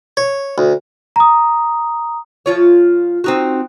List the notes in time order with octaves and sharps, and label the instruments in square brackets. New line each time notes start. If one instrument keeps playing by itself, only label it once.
[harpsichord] C#5
D2
[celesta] A#5 D#6
[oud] F3 F4 C#5
C4 D#4 F#4